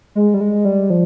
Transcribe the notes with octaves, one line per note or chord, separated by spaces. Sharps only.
G#3
G3
G#3
G3
F3